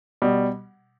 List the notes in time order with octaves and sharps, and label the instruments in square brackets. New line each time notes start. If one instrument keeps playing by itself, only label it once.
[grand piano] B2 G3